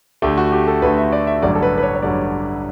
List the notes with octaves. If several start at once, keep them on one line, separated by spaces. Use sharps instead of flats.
D2 D3 A3 G4
F#4
G4
A4
D2 D3 A3 B4
E5
D5
E5
A1 G2 D3 F#3 D5
A4
B4
B4
C#5
C#5
A1 G2 D3 F#3 D5